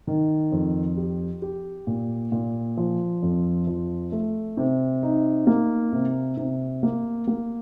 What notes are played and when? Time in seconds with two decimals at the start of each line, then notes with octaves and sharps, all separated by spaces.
0.07 D#3
0.52 F2
0.97 G4
1.42 G4
1.87 A#2
2.32 A#2
2.77 F3
3.22 F2
3.67 F3
4.12 A3
4.57 C3
5.03 D#4
5.47 A#3
5.92 C3
6.37 C3
6.83 A#3
7.27 A#3